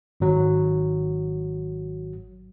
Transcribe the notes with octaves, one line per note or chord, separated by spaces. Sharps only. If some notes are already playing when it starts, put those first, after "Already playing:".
G#1 F#3